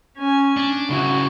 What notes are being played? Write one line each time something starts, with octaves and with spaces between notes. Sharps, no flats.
C#4 G#5
D4
C#3 E4 F#4